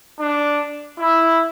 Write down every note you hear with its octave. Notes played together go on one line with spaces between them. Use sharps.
D4
E4